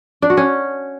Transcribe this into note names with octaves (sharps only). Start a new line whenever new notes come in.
D4
F#4
C#4